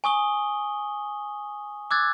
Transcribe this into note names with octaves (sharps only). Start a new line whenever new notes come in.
G#5 C#6 D#6 G7
D6 E6 F#6 G#6 A6